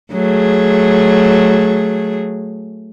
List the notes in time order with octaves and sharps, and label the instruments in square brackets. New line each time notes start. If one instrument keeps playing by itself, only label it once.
[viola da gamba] F#3 A3 G#4